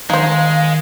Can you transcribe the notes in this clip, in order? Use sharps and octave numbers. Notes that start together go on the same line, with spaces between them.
D#3 G#3 D#4 C5 F5